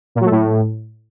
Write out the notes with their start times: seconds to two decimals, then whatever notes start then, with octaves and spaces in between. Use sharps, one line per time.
0.15 A#2
0.20 F#3
0.26 A3
0.31 A2